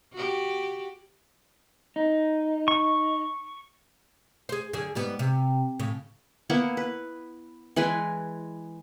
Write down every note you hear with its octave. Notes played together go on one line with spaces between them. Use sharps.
F#4 G4
D#4
C#6
G#4 C5
F#2 D3 G#4
G#2 G3 B3
C3
A2 C#3
A#3 B3 E4
B4
E3 G#3 B4 G#5